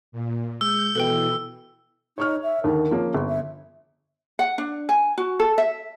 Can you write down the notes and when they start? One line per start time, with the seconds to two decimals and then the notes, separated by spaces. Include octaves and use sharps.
0.12 A#2
0.61 G#3 E6 G6
0.95 B2 E3 A4 B4 G5
2.18 D#4 C#5 C#6 F6
2.43 E5
2.64 D#2 D3 D#3 A#4
2.91 F3 A#3 C#4
3.15 G1
3.28 E5
4.39 F#5
4.58 D4
4.89 G#5
5.18 F#4
5.40 A4
5.58 E5